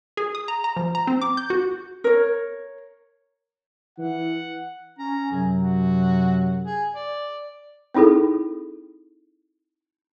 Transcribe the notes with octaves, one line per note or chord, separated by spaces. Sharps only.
G#4
D#6
A#5
A#5
F3
A#5
C4
D6
G6
F#4
A#4 C#5
E3 F#5
C#4 A#5
F#2 C3 F#3 G#4
F#4
G#4
D5
C4 D#4 E4 G#4 A4